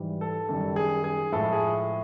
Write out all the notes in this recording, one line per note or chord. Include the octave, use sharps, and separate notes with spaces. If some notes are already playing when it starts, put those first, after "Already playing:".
Already playing: G#2 E3 G3
A4
F#2 D#3 G3 A4
G#4
G#4
A2 F3 G#3 A4
G#4